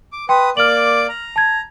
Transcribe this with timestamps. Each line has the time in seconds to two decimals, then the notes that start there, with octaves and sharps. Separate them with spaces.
0.12 D6
0.29 B4 G5 C6 D#6
0.57 A#3 D5 D6 F6 F#7
1.09 A#5
1.36 A5 G#6